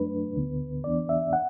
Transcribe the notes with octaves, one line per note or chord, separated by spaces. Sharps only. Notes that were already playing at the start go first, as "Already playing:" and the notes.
Already playing: F#2 F#3 A3 D4 B4
D2 D3 B3
E2 E3 B3 D4 D5
E5
F#5